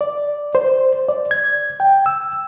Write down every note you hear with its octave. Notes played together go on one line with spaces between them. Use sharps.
D5
C5
D5
G#6
G5
E6